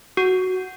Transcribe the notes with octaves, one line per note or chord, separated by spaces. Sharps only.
F#4